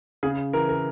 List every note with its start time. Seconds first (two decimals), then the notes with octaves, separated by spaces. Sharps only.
0.23 C#3 G#4
0.53 E3 A#4
0.69 A#4